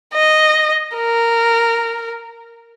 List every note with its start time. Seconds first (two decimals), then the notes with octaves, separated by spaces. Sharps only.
0.15 D#5
0.96 A#4